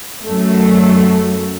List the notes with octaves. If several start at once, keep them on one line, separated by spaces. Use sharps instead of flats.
F#2 A3